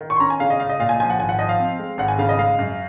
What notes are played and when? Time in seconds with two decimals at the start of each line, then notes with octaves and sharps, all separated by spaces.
0.01 D#3
0.10 C#6
0.16 C6
0.20 C#4 A#5
0.30 G#5
0.40 C#3 F5
0.50 D#5
0.60 C#2 F5
0.69 D#5
0.79 A#2 F5
0.89 G#5
1.00 F3 G#5
1.10 F#5
1.19 G#1 G#5
1.29 F#5
1.39 F3 D#5
1.49 F5
1.59 C4
1.79 G#3
1.98 G#1 F#5
2.08 G#5
2.19 C#3 F5
2.29 D#5
2.38 G#3 F5
2.59 F#2